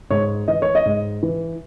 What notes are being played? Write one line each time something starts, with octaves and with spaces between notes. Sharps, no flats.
G#2 C#5
E3 D#5
C#5
D#5
G#2
E3